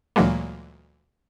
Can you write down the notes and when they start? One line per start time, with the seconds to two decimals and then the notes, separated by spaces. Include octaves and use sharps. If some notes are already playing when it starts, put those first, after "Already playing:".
0.16 D2 A#2 E3 F#3 G#3 A#3